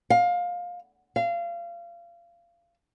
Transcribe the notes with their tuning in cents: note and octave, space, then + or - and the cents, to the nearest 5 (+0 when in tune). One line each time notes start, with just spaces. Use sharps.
F5 +20
F5 -25